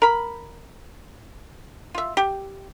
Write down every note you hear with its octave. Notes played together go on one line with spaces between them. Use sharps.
A#4 B5
F4 E5
G4